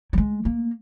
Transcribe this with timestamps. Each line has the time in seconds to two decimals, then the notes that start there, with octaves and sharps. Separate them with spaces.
0.13 F#3
0.18 G#3
0.45 A#3